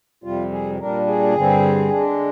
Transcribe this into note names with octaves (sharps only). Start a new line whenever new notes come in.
F2 C3 G3 F4
G#4
A#2 G3 D4 A#4
G#4
G2 D3 G3 C4
D3 G#3 D4